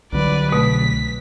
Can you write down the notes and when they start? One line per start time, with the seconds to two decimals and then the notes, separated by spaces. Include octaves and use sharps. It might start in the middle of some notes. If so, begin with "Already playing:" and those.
0.12 C2 D3 F#3 B4 D5
0.52 B2 A3 B6